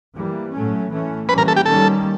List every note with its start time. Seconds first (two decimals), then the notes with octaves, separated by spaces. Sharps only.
0.16 E3 G3 A#3
0.53 A2 F#3 A3 C#4
0.91 E3 A3 C#4
1.29 E3 G3 A#3 C#4 B4
1.38 A#4
1.48 A4
1.56 G4
1.66 D#3 G3 A#3 C#4 A4